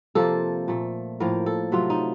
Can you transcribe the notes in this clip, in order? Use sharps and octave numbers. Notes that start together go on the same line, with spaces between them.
C3 F3 A#3 A4
A#2 A3
A2 F3 A#3 A#4
A4
C3 F#3 A3 F4
D#4